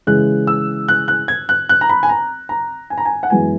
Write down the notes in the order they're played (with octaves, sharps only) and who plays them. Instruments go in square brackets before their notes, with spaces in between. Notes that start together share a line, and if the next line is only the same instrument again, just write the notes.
[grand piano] C#3 E3 G#3 F#6
E6
F#6
F#6
G#6
F#6
F#6
A#5
B5
G#5
A#5
A#5
G#5
A#5
G#5
F#5
F#2 E3 G#3 B3 E4 G#5